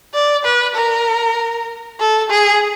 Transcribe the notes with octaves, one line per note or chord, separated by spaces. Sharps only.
D5
B4
A#4
A4
G#4